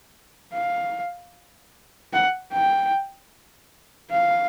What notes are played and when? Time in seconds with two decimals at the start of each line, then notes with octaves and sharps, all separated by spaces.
0.54 F5
2.13 F#5
2.53 G5
4.11 F5